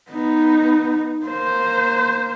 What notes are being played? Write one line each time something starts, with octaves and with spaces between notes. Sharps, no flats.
B3 D#4
A#3 C5